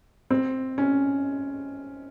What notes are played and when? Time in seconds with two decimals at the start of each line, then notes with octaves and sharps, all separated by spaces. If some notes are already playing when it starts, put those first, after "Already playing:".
0.31 C4
0.78 C#4